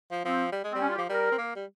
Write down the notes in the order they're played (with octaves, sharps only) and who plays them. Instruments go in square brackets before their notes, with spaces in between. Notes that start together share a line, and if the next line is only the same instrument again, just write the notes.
[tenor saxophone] F3
[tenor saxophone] F3 [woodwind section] C4
[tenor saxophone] G3
G#3
[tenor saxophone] G3 [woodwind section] C4
[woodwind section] C#4
F4
G4
[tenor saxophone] F3
[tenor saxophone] G3 [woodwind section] A#4
[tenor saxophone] C4
A#3
G3